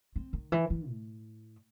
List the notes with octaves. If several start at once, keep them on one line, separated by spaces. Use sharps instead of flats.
C4
D#3
E3
E3
A2